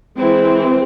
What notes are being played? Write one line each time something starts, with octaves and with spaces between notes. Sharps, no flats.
E3 G#3 C4 E4